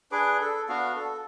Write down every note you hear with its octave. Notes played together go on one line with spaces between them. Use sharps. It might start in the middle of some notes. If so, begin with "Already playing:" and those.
D4 G#4 B4 D6
A4
B3 D4 F#4 F5
A4